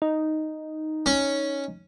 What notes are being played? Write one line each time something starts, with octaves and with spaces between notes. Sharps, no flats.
D#4
C#4